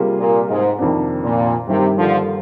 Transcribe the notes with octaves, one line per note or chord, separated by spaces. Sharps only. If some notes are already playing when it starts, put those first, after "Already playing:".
Already playing: C3 G3 A#3 F4 G#4
A#2
G#2
F2 C3 D#3 A#3 D4
A#2
G2 C3 D#3 G3 A#3
D3 F3